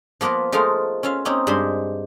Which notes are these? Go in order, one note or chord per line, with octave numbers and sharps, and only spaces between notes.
F3 A#3 B3 A#4 B4
F3 G#3 A3 D#4 A#4 F5
C#4 F4 E5 F5
A#3 C4 C#4 D#4
G2 G#3 C5 B5 C6